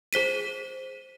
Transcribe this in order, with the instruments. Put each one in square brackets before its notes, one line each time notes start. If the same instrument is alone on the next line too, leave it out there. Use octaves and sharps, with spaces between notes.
[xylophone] G#4 C5 B6 D#7